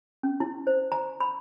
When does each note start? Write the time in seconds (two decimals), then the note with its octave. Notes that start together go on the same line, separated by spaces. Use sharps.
0.23 C#4
0.40 E4
0.67 C5
0.92 A#5
1.20 B5